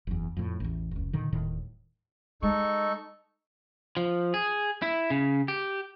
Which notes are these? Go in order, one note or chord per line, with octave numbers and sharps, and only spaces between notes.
F#1 E2
F2 A2
A1 E2
F1 C#2
A#2 D3 D#3
D#1 A2 D#3
G#3 D#4 A4 C#6
F3
G#4
E4
C#3
G4